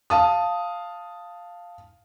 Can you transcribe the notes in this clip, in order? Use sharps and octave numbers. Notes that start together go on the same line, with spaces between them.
F5 A5 D#6